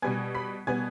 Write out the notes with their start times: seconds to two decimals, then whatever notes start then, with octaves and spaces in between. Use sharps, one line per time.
0.02 B2 G3 B3 G#5 G#6
0.35 B5 B6
0.67 B2 G3 B3 G#5 G#6